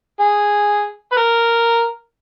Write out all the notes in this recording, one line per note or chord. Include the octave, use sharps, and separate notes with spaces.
G#4
B4
A#4